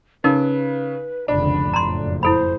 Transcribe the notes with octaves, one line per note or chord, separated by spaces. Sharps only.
C#3 D#4 A#4 B4
F1 C#2 D3 D4 B5
F#1 F2 A2 A#5 C6
E4 A4 C5 B5